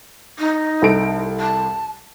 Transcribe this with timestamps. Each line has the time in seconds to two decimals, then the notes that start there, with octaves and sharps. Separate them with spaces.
0.39 D#4
0.82 C2 A4 D7
1.40 A5